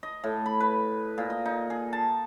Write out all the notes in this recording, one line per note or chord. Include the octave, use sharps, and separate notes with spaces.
D#5
A2
B5
B4
A#2
D#5
D#4
G#4
A5